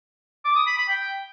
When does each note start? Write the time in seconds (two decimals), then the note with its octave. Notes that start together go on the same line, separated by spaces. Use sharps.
0.45 D6
0.56 D#6
0.67 B5
0.78 B5
0.89 G5